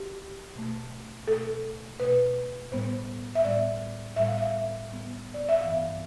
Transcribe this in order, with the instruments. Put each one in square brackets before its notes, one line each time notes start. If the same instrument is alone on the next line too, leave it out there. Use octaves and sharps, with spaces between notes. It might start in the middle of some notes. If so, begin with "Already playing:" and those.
Already playing: [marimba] G4
B2 A3
B2 A3 A4
B2 A3 B4
A2 G3 B3 C5
E5
A2 G3 B3 D5
A2 G3 B3 E5
F5
E5
A2 G3 B3
D5
E5
G2 E3 B3 F5